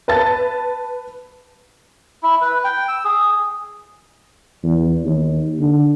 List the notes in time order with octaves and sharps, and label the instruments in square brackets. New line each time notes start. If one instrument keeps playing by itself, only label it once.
[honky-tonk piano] B4 A5 A6
[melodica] E4
B4
G5
E6
G#4
[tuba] E2
D#2
D3